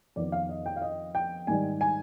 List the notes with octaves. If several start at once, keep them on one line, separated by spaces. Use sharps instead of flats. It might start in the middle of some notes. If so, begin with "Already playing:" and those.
F2 D#3 B3 D5
F5
D#5
G5
F5
D#5
G5
G#2 D#3 G3 G#5
G#5